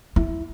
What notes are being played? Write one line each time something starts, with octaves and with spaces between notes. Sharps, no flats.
E4